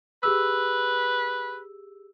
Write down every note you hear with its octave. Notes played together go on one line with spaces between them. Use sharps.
G4 G#4 B4 E6